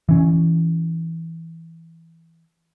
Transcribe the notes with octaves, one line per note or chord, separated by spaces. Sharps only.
E3 C#4